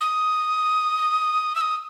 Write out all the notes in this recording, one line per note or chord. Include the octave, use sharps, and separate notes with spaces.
D#6
E6
D#6